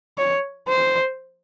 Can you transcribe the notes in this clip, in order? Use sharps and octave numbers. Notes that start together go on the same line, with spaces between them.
C#5
C5